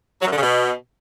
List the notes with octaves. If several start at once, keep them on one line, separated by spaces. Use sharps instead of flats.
F#3
F#2
D3
C#3
B2